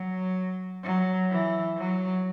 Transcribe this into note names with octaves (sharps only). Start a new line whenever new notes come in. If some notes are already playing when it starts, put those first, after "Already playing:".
Already playing: F#3
F#3
E3
F#3